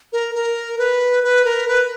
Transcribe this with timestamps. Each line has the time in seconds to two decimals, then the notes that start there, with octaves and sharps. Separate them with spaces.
0.13 A#4
0.35 A#4
0.78 B4
1.24 B4
1.45 A#4
1.68 B4